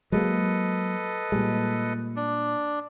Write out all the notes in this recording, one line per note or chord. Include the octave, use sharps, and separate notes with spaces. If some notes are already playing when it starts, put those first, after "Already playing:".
F#3 G#3 A#3 A4 B4 D#5
A#2 G3 G#3
D4